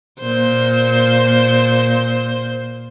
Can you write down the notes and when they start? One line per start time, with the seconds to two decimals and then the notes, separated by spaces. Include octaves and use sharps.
0.20 A#2 C5